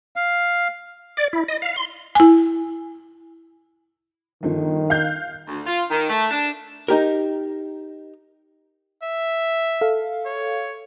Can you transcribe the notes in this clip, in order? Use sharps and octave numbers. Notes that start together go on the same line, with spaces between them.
F5
D5
E4
D#5
F5
C6
E4 G#5
G1 D#3 F3
F5 F#6 G6
D2
F4
D#3
A3
D4
D#4 G4 A#4
E5
A4 F5
C#5